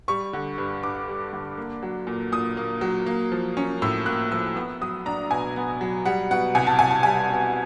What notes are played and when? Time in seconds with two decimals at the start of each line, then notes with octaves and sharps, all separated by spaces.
0.08 G3 C#6
0.33 D3
0.58 G2
0.83 G2 D6
1.08 G3
1.33 D3
1.57 A#3
1.83 F#3
2.07 A#2
2.32 A#2 D#6
2.57 A#3
2.81 F#3
3.06 A#3
3.32 F3
3.57 C#4
3.82 A2 E6
4.06 A#3 F#6
4.32 F3 E6
4.56 B3 E6
4.81 F#3 D#6
5.06 D4 A#5
5.30 B2 G#5
5.56 B3
5.81 F#3
6.05 G3 F#5
6.31 B2 F#5
6.55 C2 G#5
6.67 A5
6.79 C2 G#5
6.91 A5
7.03 G3 G#5
7.30 B2